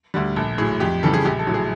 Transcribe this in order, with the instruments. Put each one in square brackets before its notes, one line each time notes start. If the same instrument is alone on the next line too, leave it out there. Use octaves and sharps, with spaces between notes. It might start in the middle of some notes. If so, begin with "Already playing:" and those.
[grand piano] D2 D3 G3
A#1 A4
A2 F#3 G#4
F2 G4
C#3 E3 G3 A4
G#4
A#1 G4
A4
A2 F#3
G#4